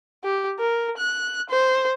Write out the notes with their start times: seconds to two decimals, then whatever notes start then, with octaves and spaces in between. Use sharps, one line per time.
0.24 G4
0.59 A#4
0.97 F#6
1.50 C5